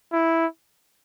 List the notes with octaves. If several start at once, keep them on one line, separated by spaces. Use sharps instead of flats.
E4